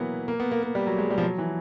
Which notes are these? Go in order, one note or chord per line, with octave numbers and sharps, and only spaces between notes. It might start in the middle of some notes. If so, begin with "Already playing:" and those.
Already playing: E3 F#3 A#3 B3
A#3
B3
A#3
A#3
G3
F#3
G#3
G3
F3
F#3
E3